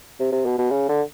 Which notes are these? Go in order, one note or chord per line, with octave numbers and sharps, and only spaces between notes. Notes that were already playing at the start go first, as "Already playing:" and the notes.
C3
C3
B2
B2
C#3
D3